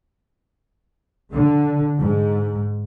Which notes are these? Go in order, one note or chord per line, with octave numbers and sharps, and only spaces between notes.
D3
G#2